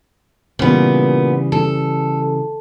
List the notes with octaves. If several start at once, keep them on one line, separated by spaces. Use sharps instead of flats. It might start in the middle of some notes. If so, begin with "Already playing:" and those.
A#2 C#3 E3 G3 B3
A4